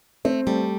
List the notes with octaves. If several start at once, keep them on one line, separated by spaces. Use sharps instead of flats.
A3 C4
G3 A3